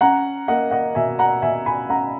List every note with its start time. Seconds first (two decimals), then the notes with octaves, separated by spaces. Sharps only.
0.01 C#4 F#5 A#5
0.48 A#3 D#5 F#5
0.71 D#5 F#5
0.95 B2 E5 G#5
1.19 F#5 A#5
1.42 B2 E5 G#5
1.66 G#5 B5
1.90 C#4 F#5 A#5